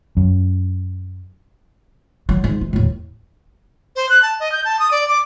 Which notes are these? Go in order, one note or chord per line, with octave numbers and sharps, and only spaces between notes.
F#2
F#3
G#2
E3
D#2 A2
C5
F#6
A5
D#5
G6
A5
D#6
D5
D6